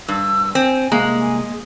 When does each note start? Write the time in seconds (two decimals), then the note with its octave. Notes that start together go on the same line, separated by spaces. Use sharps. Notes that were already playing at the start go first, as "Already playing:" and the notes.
0.08 G2 E6
0.55 C4 G#5
0.92 C2 G#3 A#3 A#5
1.21 G#5
1.42 G#4